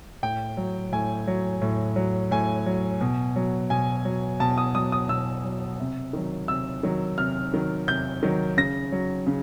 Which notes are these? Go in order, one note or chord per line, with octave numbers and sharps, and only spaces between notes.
A2 G5
F#3
A2 G#5
F#3
A2
F#3
A2 G#5
F#3
B2
F#3
B2 G#5
F#3
B2 A5
D#6
F#3 D#6
D#6
B2 E6
F#3
C3
D#3 F#3
C3 E6
D#3 F#3
C3 F6
D#3 F#3
C3 G6
D#3 F#3
C#3 A#6
F#3
C#3